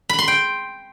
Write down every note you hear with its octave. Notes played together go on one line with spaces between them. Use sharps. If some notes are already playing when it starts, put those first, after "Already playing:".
B5
C6
G5